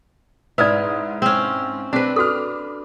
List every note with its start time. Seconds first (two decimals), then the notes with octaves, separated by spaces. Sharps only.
0.58 G#2 E4 B4 D5 D#6 F6
1.22 C4 C#4
1.93 C4 D4 B4
2.16 F#4 A4 D6 F6